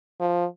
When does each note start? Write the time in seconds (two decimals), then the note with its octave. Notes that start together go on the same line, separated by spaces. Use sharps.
0.20 F3